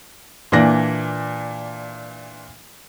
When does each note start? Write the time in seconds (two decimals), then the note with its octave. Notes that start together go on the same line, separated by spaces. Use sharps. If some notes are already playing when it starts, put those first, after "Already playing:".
0.52 A#2 E3 D4 D5 A#6